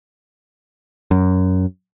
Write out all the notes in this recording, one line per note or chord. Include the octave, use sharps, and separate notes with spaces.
F#2